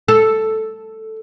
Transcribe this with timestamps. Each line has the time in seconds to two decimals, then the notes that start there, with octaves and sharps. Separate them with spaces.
0.08 A4